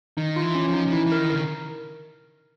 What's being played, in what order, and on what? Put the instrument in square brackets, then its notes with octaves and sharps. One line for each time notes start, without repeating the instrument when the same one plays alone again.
[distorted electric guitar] D#3 [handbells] D#4
[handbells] F4
[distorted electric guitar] E3
[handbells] C#4
[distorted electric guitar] F3
[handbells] D#4
[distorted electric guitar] F3
[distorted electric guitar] E3 [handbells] E4
[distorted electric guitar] E3
[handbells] A#4
[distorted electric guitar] D#3
[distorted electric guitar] C#3 [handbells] A#4